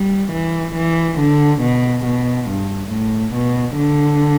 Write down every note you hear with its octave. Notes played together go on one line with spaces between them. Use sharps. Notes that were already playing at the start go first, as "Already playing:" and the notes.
Already playing: G3
E3
E3
D3
B2
B2
G2
A2
B2
D3